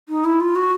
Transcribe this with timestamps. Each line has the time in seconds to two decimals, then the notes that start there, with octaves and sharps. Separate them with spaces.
0.09 D#4
0.25 E4
0.40 F4
0.56 F#4